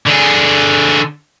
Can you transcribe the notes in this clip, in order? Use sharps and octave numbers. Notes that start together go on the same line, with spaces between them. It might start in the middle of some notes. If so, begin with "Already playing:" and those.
D3 G#4